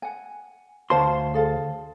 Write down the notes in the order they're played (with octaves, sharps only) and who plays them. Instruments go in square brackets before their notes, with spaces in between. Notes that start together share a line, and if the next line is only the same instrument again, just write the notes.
[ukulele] F#5 G#5
[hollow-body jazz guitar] D2 C5 C6 [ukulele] C#5 F5 A5
[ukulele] G#4 A4 F5